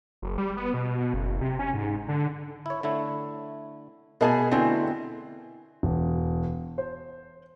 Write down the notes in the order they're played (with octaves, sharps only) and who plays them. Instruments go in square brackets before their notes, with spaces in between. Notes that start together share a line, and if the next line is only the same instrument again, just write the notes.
[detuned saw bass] F#1
G3
B3
B2
B2
F#1
C3
C#4
G#2
D3
[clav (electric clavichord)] E4 C#5
D3 A3 E4
[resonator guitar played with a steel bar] B2 G#4 G#5 [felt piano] A#4 D#5 A5
[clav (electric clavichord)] B2 D3 A3 [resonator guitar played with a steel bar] C4 [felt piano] E4 G#5
[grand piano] E1
C5